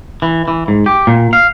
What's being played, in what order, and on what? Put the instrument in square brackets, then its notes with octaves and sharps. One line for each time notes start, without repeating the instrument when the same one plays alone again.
[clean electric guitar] E3
E3
G#2
G4
A#2
F5